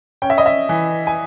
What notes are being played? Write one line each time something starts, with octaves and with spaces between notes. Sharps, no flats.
C#4 G5
E5
D#5
E5
E3
G#5